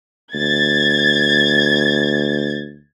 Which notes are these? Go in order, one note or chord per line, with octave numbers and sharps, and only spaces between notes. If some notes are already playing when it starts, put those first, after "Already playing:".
D2 G#6 A6